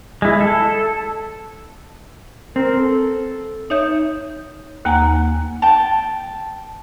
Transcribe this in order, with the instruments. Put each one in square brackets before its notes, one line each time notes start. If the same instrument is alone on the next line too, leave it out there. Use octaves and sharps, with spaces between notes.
[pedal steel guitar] G#3 E4
A4
[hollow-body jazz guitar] C4 [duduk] A#4
[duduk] A4
[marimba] D#4 C#5 E5 G6
D#2 A#3 F#5 G#5 A#5
[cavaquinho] G5 A5